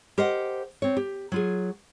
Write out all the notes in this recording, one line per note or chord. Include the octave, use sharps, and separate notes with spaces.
G4 A#4 C5 D#5 F#5
C4 C#5
G4
F#3 F4 G#4